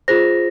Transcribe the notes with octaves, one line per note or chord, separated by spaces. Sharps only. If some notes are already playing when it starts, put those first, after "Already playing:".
F4 G#4 C5 A#6